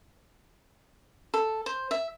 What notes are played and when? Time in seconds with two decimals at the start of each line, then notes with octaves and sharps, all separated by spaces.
1.34 A4
1.66 C5
1.91 E5